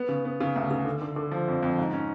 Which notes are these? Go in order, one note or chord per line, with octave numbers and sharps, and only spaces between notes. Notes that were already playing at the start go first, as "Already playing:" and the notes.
Already playing: B3
C#3
B3
C#3
D2
C#3
D3
D3
D3
F3
F2
F2
G#2
C#4